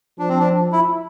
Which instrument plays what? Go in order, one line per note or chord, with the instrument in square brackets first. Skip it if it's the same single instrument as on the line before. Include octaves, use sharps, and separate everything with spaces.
[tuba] F3 [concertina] D4
[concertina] C4
D4
E4